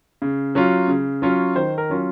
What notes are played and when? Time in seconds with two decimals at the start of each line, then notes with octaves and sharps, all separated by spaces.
0.22 C#3
0.55 F#3 C#4 F4
0.88 C#3
1.22 F#3 C#4 F4
1.55 D#3 C5
1.78 A#4
1.90 F#3 C#4 F4